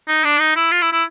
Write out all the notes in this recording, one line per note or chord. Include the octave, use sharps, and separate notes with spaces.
D#4
D4
D#4
E4
F4
E4
E4